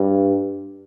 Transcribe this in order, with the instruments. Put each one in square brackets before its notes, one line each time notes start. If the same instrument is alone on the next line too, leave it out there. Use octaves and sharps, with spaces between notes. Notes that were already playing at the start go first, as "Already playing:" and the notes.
Already playing: [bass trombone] G2